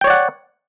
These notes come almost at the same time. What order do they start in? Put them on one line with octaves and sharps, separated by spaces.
G5 C#5 D5 F#5